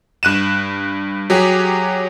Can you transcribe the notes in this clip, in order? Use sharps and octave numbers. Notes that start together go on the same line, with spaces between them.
G2 F#6 D#7 E7
F#3 G4 G#4